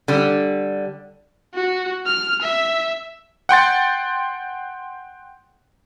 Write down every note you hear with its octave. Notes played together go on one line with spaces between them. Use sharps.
D3 G3
F#4
F6
E5
F#5 G5 C6 A6